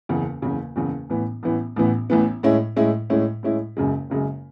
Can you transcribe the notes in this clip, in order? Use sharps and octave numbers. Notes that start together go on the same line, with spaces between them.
F#1 E2 C#3
F#1 E2 C#3
F#1 E2 C#3
A1 A2 E3 B3
A1 A2 E3 B3
A1 A2 E3 B3
A1 A2 E3 B3
A2 G#3 C#4 E4
A2 G#3 C#4 E4
A2 G#3 C#4 E4
A2 G#3 C#4 E4
F#1 F#2 C#3 G#3
F#1 F#2 C#3 G#3